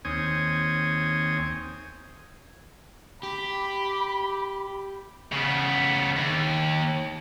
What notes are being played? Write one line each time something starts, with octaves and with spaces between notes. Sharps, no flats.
D#2 C4 C#5 G#5 D#6
G4 B5
C#3 B3
D#2